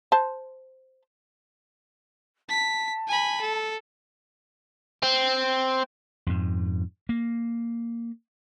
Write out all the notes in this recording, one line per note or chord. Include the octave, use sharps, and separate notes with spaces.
C5 A5
A5 B6
G#5 B5
A4
C4
F2 G#2
A#3